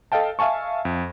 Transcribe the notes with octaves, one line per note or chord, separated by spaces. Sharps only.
A4 D#5 F5 G5 A5
E5 F5 G#5 A5 C#6
F2